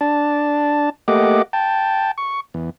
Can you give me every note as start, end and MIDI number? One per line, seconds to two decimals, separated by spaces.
0.01 0.90 62
0.01 0.90 81
1.08 1.42 57
1.08 1.42 58
1.08 1.42 67
1.08 1.42 75
1.08 1.42 78
1.08 1.42 86
1.53 2.11 79
1.53 2.11 81
2.18 2.40 85
2.54 2.70 40